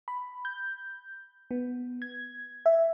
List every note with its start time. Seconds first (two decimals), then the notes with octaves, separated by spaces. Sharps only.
0.08 B5
0.45 G6
1.51 B3
2.02 G#6
2.66 E5